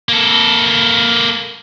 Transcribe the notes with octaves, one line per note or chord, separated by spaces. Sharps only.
A#3 A4